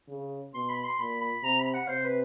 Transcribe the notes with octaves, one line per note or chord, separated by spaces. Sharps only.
C#3
B2 C6
B5
C6
A#2 B5
B5
C3 A#5
B5
F#5
C3 C5
B4